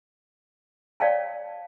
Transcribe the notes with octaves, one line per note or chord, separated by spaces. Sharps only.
C#5 D5 F5 G5 A5